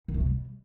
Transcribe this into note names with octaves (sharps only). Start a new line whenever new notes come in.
D#3
A3
C3
G3